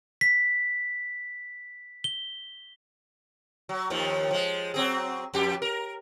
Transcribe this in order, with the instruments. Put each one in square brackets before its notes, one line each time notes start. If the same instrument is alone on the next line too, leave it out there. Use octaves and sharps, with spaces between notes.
[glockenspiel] B6
G7
[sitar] F#3
D#2 D#3 F3
F3 G#3
F#3 C4 G#4
F2 G4
A#4